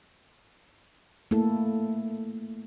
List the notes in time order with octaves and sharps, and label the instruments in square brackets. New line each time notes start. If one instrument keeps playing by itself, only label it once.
[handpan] A3 A#3 E4 A4